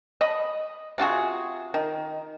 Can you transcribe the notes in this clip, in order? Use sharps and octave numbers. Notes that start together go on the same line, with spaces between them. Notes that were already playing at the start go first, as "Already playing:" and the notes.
D#5 B5
C3 F4 F#4 G#4
D#3